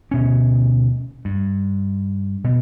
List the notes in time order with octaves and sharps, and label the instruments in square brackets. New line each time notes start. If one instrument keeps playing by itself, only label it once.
[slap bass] D2 B2 C#4
G2
B2